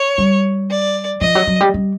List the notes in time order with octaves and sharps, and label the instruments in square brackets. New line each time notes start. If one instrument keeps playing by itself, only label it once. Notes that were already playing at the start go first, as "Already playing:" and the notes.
Already playing: [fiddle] C#5
[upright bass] G3
[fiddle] D5
[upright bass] F3 [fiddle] D#5
[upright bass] F#3
F#3
G3
G3